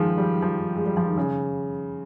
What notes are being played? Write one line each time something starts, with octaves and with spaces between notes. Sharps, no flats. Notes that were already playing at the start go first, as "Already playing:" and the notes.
Already playing: D#3 F3 G#3
G3
F3
G#3
G3
F3
D#3
C#3